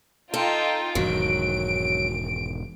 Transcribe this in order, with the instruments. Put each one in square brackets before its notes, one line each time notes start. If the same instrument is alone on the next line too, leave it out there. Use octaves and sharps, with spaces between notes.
[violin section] D#4 F4 G5 [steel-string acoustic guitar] A4
[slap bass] E1 G#2 D#3 [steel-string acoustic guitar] F#3 [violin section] D7